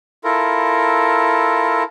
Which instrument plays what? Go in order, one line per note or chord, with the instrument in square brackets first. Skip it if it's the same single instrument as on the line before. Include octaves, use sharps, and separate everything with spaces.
[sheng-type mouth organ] E4 F4 A4 A#4